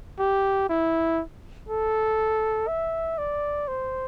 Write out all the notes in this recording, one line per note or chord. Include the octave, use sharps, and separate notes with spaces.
G4
E4
A4
E5
D5
C5